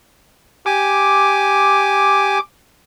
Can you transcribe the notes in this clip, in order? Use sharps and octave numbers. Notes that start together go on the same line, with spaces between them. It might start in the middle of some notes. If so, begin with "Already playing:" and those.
G4 G#5 D6